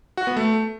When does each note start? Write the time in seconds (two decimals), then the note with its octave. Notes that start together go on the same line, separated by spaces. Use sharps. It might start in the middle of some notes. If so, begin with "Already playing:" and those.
0.17 F#4
0.27 B3
0.37 A3